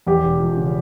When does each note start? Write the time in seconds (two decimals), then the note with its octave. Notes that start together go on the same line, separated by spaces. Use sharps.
0.07 E2 G4
0.23 E1
0.40 F3
0.57 C#3